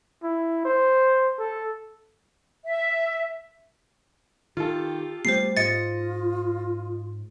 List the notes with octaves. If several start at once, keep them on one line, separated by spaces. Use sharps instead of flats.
E4
C5
A4
E5
D#3 F4 G4 A4
G3 A3 B3 G4 C5 C7
G#2 F4 D#5 A6 C#7